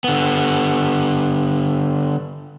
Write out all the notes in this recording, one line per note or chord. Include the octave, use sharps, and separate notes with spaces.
D3 B3